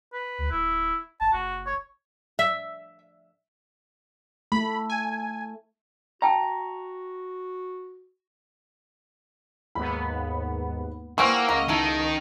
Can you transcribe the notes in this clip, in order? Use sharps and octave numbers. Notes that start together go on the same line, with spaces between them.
B4
D2
D1 E4
G#1 A5
F#1 F#4
C#5
E5
A3 B5
G#5
F#4 E5 G5 A5 A#5
D#2 G#2 B3 B5
E3 G3 A#3 C4 F#5 C#6 E6 F6
C#2 D#5 A#5
D#3 D#4 E4 A4